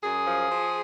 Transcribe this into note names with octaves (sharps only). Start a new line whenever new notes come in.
F#2 G#4
F3
F3